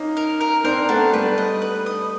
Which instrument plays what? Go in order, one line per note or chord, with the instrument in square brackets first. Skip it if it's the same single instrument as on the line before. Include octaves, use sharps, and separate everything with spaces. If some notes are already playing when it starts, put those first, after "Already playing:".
Already playing: [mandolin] A#3 [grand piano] C#4 D#4
[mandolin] A#4
A#4
[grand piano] C4 D4 [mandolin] A#4
[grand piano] A3 B3 [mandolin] D4
[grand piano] G3 A3 [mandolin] B4
[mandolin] D#5
B4
D#5